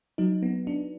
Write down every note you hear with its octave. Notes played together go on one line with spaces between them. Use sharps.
F#3 D#4
B3
D4